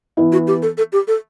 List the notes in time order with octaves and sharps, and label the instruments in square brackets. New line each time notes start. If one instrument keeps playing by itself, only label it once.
[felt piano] E3 B3 E4
[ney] F#4
G4
A4
A4
G4
A4